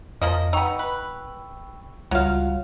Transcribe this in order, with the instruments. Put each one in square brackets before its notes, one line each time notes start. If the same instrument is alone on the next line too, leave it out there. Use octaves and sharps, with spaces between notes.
[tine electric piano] F2 [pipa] F3 A#3 D#5
[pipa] B3 D#4 [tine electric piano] G5 C#6 E6
[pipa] B4
[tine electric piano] C#2 G3 F4 [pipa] F#3 F5